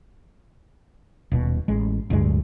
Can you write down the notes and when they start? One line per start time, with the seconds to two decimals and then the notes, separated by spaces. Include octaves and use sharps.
1.32 D#1 B2
1.68 A1 G#3
2.10 D1 D2 G2 G#3